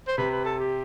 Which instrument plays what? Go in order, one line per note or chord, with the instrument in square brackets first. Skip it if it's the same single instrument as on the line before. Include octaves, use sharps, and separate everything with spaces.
[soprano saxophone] C5
[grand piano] C3 [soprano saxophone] B4
[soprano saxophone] B4
A4
G4